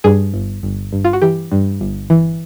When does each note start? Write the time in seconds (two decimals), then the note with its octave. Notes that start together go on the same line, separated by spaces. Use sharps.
0.04 G2 G#4
0.34 G1
0.63 G1
0.92 G2
1.05 F4
1.13 F#4
1.22 E3 G4
1.51 G2
1.81 G1
2.10 E3